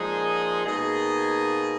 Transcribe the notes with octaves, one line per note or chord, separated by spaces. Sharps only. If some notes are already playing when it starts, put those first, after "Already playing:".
Already playing: A#2 F3 G#3 D#4 G#4
B2 A#3 D#4 G#4